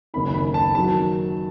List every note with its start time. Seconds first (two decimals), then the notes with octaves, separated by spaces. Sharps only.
0.14 F#1 F#2 D#3 B5
0.34 B5
0.54 A5
0.75 D#3 F#3 A5